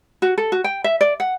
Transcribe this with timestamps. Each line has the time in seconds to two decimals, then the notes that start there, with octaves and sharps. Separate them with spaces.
0.22 F#4
0.38 A4
0.52 F#4
0.64 G5
0.84 E5
1.01 D5
1.20 F#5